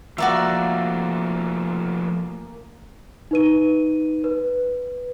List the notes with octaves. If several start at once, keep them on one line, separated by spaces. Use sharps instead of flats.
F3 A3 A#3 F#4 D5 E5
D#4 B4 D#7
B4